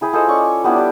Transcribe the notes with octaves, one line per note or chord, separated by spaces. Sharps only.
E4 G#4 G5 B5
F4 A4 C5 D#5
C#4 A4 D5 C#6
G3 B3 D4 E4
D4 G4